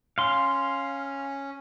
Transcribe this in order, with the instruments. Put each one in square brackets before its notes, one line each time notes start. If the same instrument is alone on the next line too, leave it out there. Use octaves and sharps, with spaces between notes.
[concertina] C#4 [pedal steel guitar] F5 C6